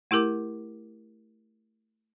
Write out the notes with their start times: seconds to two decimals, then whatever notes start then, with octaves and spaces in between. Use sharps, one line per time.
0.11 A3 E4 G4 A#4 D6